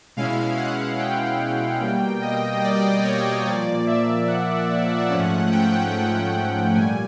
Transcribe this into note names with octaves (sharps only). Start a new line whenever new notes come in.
B2 G#3 C#4 E4 F5
F#5
G5
B2 G3 A#3
D#5
D5
C#5
A#2 F3 A#3 D5
E5
F#5
G#2 F3 A3 C#4
G5
A#2 G3 G#5